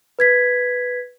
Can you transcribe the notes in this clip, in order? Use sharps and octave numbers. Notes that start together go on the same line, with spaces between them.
B4 G#6 B6